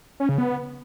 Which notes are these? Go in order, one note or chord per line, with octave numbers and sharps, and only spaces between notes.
C#4
C#3
B3